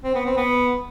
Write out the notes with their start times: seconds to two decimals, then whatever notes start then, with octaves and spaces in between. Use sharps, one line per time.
0.04 C4
0.15 B3
0.26 C4
0.37 B3